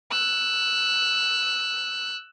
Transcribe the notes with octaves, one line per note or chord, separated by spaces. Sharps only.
E6 F#6